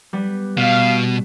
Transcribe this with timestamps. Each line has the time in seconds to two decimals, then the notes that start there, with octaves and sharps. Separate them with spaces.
0.13 G3 B3
0.58 B2 F5